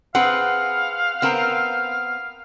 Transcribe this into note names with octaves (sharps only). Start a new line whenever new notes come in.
C4 G#4 B4 F5 F#5
B3 C4 A#4